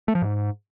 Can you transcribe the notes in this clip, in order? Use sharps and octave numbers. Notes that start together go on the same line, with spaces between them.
A3
F3
G#2